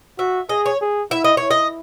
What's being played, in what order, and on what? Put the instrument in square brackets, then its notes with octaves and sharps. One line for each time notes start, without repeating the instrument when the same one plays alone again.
[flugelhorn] F#4 [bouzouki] E5
[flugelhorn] G#4 [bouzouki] D#5
[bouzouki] C#5
[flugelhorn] G#4
[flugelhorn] E4 [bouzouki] E5
[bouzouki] D#5
[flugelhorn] E4 [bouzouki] C#5
[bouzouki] D#5